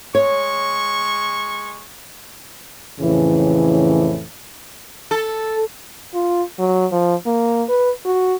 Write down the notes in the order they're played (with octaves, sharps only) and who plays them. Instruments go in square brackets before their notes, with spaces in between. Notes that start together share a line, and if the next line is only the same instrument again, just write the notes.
[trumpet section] G#3 C#6 [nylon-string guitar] C#5
[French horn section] F2 A2 C#3 E3
[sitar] A4
[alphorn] F4
F#3
F3
A#3
B4
F#4